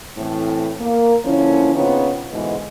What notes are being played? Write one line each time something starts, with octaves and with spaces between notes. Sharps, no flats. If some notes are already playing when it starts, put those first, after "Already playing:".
A2 E3 C4
A#3
D3 F3 A#3 C#4 E4 F4
C#3 B3 C4 D#4 F4 C#5
G#2 B2 D3 E3 G#3